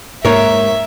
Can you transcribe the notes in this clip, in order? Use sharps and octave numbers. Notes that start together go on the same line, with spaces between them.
G#2 A#3 A#4 C#5 E5